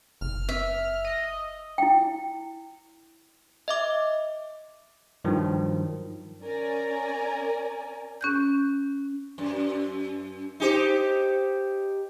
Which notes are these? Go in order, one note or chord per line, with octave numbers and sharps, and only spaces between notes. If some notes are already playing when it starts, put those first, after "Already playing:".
F#1 F6
E5
D#5
E4 G5
D#5 E5 D6
G2 D#3 F3 F#3
C#4 A#4 D5 G#5 A#5
C#4 F#6 G6
F#2
D#4 G4 C5